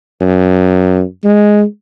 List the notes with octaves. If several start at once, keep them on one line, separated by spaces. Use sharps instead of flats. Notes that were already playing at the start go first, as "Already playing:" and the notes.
F#2
G#3